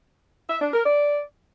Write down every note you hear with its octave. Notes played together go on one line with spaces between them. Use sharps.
E5
D4
A#4
D5